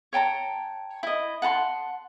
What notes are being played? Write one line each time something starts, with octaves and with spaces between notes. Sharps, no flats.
C#5 G5 A5 A#5
E4 D#5
F#5 A5 A#5 C6